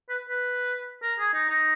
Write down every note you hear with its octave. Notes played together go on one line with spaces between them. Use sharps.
B4
B4
A#4
G#4
D#4
D#4